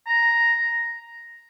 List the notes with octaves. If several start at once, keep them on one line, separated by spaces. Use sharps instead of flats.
A#5